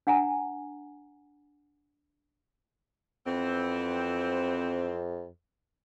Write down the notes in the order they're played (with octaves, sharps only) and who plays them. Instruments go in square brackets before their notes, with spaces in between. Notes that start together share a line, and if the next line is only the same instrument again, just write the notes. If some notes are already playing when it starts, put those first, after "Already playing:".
[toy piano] D4 F#5 G#5 A#5
[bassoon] F2 [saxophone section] E3 B3 C4